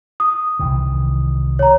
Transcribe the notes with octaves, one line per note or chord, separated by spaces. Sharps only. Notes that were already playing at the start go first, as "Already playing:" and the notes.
D#6
C2 D#3 E3
C#5 A#5